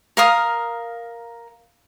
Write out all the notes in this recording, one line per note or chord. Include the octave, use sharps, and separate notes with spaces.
A#4 F5 D#6